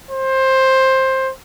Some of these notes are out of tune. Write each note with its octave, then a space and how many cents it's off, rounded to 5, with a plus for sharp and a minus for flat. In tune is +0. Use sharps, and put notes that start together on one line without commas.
C5 +15